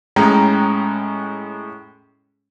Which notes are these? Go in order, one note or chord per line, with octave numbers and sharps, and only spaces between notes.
A2 G#3 C#4 G5 A#5